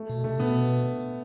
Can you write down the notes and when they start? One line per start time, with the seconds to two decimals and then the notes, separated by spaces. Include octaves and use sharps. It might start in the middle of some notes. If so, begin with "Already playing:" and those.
Already playing: A3
0.10 B2
0.24 C3 A3
0.40 B2 B3